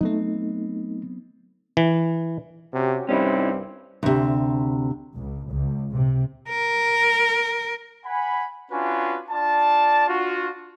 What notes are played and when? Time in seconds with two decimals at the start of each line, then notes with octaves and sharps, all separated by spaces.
0.01 F#3 A3 B3 C4 D#4
1.77 E3
2.74 C3 C#4 F#4 G4
3.09 C2 G2 G3 C4 C#4 D#4 E4
4.03 D2 C3
5.16 C#2
5.50 C#2
5.92 C3
6.49 A#4
8.05 F#5 G#5 B5
8.72 C#4 D4 F4 F#4 B4 G#5
9.30 D4 F4 D5 A5
10.07 D4 F4 F#4